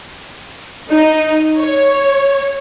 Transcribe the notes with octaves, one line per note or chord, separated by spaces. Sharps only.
D#4
C#5